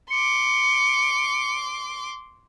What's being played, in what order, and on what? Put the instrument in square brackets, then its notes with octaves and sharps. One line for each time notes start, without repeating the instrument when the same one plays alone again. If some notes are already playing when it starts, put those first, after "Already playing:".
[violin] C6 D6 [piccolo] C#7